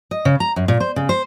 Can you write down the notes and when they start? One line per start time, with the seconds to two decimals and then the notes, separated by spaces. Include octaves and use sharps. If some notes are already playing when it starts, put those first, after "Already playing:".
0.11 D#5
0.25 C#3
0.40 A#5
0.56 F#2
0.68 A#2
0.80 C5
0.96 C#3
1.09 C5